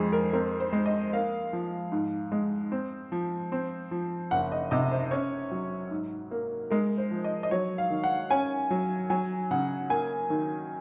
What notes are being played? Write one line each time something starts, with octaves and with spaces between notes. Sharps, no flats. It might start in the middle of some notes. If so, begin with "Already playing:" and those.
Already playing: F2 G#3 G#4 C5
A#4
C4 A#4
C5
G#3
D#5
A#3 F5
F3
G#2
G#3
C4
F3
C4
F3
F#1 F#5
D#5
C3 D#5
C5
C#4 C#5
F#3
G#2
A#3
G#3 A#4
C5
F3
D#5
D#5
F#3 C#5
F5
D#3
F#5
C#4 G#5
F#3
F#3 G#5
C#3 F#5
A#3 G#5
D#3